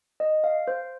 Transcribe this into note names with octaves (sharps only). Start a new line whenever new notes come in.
D#5
F5
C5